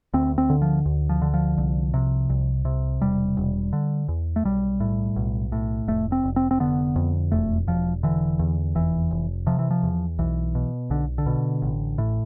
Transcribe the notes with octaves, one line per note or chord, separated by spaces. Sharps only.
D2 C4
C4
D3
F3
D2
F3
D3
F3
C2
C3
C2
C3
E1 G3
E1
D3
E2
A3
B1 G3
A2
B1
A2
F1 A3
C4
F1
C4
C4
D3 B3
F2
E1 A3
E1 F3
D3 E3
E2
F1 E3
F1
C3 F3
E3
F3
E2
B1 E3
B2
B1 D3
D3
B2
A1
A2